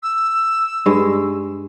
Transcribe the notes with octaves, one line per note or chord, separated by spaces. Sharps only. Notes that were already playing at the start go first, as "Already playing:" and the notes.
E6
G2 G#3